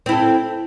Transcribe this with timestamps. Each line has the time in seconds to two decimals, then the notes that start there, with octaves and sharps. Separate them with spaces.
0.06 C4
0.09 E4
0.12 A4